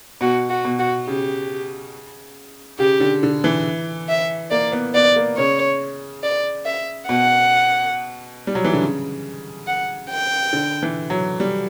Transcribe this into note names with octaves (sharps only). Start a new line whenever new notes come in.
B2 F#4
F#4
B2
F#4
C#3 G4
C#3 G4
D3
D3
E3
E5
A#3 D5
B3
B3 D5
A#3
C#3 C#5
D5
E5
B2 F#5
G3
F#3
E3
D3
C#3
F#5
G5
D3
E3
F#3
G3